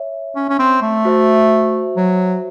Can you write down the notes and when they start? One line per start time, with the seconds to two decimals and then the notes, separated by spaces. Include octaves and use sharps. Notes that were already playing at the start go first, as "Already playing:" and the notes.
Already playing: C#5 E5
0.36 C#4
0.50 C#4
0.60 C4
0.82 A3
1.05 F#4 C5 E5
1.97 F#3